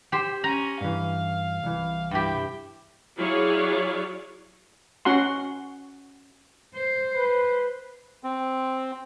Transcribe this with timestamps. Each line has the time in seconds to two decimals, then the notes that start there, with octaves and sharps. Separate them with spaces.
0.12 G4 C5
0.44 C#4 G#5 A#5
0.81 G2 E3 F5
1.63 C2 E3
2.11 G2 E4 G4 G5
3.17 F#3 E4 G#4 C#5 D5 F5
5.05 C#4 F#4 F#5 C6
6.75 C5
7.14 B4
8.24 C4